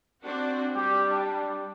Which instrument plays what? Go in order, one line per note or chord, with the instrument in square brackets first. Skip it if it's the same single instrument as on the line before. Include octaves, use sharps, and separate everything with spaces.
[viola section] C4 D4 F#4
[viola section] G3 [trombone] G4
[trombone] D4